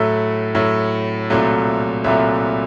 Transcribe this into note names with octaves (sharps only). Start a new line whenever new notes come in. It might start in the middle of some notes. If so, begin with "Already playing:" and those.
Already playing: A2 F#3 A3 E5
A2 F#3 A3
C2 A#2 F#3 A3
C2 A#2 F#3 A3 E5